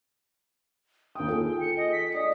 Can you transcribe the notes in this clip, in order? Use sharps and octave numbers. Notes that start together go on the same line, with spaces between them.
D#2 G5 D#6
F4 G#4 A4
C#7
D#5
B6
D5 D#5 D#6